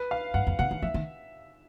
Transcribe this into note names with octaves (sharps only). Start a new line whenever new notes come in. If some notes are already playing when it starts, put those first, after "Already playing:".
Already playing: B4
F5
G2 F#5
F2
B2 F#5
D#3
F3 E5
D#3